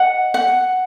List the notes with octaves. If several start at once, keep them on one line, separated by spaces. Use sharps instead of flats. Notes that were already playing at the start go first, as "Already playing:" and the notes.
Already playing: D#5 F#5
F#5